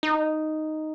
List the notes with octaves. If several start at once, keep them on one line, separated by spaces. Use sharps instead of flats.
D#4